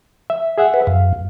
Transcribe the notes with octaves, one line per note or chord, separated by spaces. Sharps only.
E5
G#4 E5 F#5
B4
F#2 F5